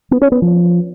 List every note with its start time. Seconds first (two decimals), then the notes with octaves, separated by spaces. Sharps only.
0.11 B3
0.21 C#4
0.32 B3
0.42 F3